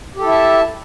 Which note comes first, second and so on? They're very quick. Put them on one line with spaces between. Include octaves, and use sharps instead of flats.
G4 A4 E4 E5 A5